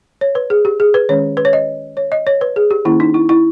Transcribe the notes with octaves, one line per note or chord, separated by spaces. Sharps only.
C#5
B4
G#4
G4
G#4
B4
D#3 G#3 C#4 C#5
B4
C#5
D#5
C#5
D#5
C#5
B4
G#4
G4
D#3 A#3 C#4 E4
D#4
E4
E4